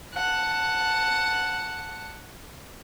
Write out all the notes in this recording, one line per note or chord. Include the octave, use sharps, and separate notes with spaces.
F#5 A5